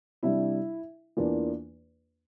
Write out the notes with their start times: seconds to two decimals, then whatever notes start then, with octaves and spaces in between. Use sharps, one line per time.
0.23 C3 G3 D4 E4 E5
1.17 E2 E3 A#3 D4 F4